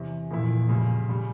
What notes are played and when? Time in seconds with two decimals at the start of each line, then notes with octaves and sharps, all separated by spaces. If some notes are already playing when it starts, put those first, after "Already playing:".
Already playing: E2 C3 E3
0.31 G1 F2 A#2 E3 A#3 E4
0.69 F2 C#3 G3
1.09 C#3 G3